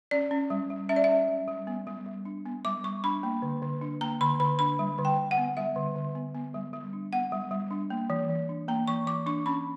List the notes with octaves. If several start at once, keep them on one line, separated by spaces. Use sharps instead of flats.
C#4 D5
C#4
G3
G3
C#4 E5
D5
C#4 E5
G3
G3
B3
G3
G3
D4
B3
G3 D6
G3 C#6
D4 B5
A#3
D3
D3
D4
A#3 A#5
D3 B5
D3 B5
D4 B5
G3
D3
G5
D3
F#5
B3
G3 E5
D3
D3
B3
B3
G3
G3
D4
B3 F#5
G3
G3
D4
A#3
E3
E3
D4
A#3 A#5
E3 C#6
E3 D6
D4 C#6
C#4 B5